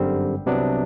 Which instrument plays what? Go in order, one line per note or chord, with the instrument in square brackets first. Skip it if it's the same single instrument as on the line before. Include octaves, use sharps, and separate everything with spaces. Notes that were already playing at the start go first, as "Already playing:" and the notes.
Already playing: [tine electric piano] G1 F#2 D3 G3 C4
C2 C3 F#3 B3 D4